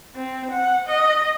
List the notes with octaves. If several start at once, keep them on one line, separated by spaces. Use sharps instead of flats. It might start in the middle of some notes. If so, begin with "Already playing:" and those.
C4
F#5
D#5